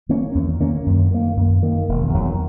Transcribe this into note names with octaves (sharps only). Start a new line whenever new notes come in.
D#3 A#3 C#4
E2
D#3 A#3 C#4
F#2
D#3 A#3
F#2
D#3 A#3
E1
E2 D#3 F#3